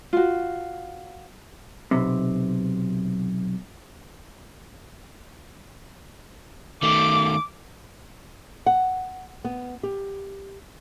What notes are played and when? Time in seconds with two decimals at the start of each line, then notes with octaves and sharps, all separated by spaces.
0.13 F4 F#4
1.91 B1 C3
6.83 D#3 A3 D6
8.66 F#5
9.44 B3
9.83 G4